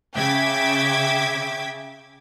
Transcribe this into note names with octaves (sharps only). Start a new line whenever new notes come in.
C#3 E5 G5 D6 G#6 B6